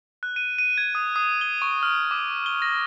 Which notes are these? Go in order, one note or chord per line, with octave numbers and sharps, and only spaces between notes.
F#6
D#7
D#7
G#6
D#6
D#6
G7
C#6
F6
D6
G7
A#6